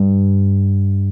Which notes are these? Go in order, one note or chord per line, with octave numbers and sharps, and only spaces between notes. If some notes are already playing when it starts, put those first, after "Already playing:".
Already playing: G2